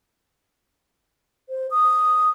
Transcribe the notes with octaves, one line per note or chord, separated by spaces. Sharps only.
C5
D#6